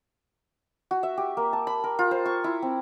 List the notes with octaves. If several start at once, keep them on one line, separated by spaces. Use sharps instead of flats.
F#4
E5
G4
A#3
A5
B5
A#4
F4
C5
C#6
E4
C4